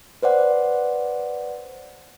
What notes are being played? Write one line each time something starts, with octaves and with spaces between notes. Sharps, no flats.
B4 C5 D5 F#5